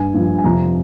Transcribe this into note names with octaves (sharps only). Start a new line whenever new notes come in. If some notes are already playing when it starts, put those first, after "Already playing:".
Already playing: G2 G#5
G2 F3
G#5
F2 C3 F3 A#5